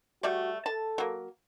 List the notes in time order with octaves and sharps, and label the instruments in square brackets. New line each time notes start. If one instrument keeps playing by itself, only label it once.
[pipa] G3 A3 D5 [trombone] F#4
[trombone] A4 [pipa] A5
[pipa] F#3 A#3